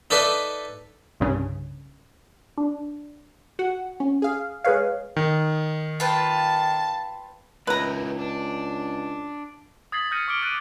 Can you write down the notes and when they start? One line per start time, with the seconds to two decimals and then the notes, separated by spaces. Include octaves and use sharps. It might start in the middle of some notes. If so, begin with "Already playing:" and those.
0.10 D#4 A4 B4 D5 E5
1.20 C2 G2 C#3
2.58 D4
3.59 F#4 F#5
4.00 C#4
4.22 G#4 F5
4.64 G#3 G#4 B4 C#5 F5
5.16 D#3
6.00 F4 B4 G5 A5
7.67 C#2 D#4 E4 A#4 B4 A#5
8.19 D4
9.92 D#6 G#6 A6 B6 C7 F#7
10.11 D#6 F6 G6 A#6 C#7 D#7
10.28 C#6 D6 F6 C#7 D7 G7
10.42 D6 F#6 A6 D7 D#7